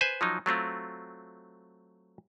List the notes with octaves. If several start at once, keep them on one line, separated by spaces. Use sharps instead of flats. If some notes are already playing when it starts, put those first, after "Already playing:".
B4 C5 G#5
F3 F#3 D#4
F#3 A3 C4 F4